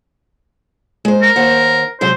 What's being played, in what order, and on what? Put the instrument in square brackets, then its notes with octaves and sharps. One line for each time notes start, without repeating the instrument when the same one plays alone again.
[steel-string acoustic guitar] G#3 C5
[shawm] A#4
[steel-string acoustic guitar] D#2 C5 F#5
[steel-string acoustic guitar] C3 F#3 G#3 [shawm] C5